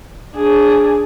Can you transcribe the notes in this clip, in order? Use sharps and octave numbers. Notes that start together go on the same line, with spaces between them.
D4 G#4